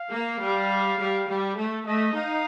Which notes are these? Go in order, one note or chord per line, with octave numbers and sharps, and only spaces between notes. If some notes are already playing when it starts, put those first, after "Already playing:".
Already playing: F5
A#3
G3
G3
G3
A3
A3 D#5
D#4 F5